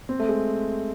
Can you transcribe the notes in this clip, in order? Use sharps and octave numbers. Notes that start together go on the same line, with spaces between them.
C4
A3
G#3